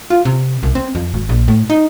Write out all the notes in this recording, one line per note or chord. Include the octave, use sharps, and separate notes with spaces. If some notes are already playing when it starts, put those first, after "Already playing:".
F4
C3
C2
C4
F2
G#1
A#1
A2
D#4